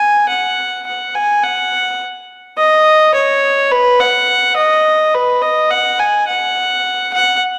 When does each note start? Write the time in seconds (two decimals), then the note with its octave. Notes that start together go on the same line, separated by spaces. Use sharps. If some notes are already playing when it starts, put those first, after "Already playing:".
Already playing: G#5
0.29 F#5
0.86 F#5
1.15 G#5
1.43 F#5
2.58 D#5
3.14 C#5
3.71 B4
4.00 F#5
4.57 D#5
5.14 B4
5.42 D#5
5.71 F#5
6.00 G#5
6.28 F#5
7.13 F#5